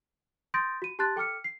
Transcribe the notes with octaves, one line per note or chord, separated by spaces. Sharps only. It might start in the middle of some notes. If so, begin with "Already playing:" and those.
C6 D#6 G6 A6 A#6 D7
F#4 D#7
G4 A5 C6 F#6 A6
A4 G5 D6 F6 C#7
C7